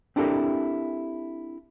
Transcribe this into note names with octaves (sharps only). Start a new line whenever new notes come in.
C4 D4 E4 G4 A4 A#4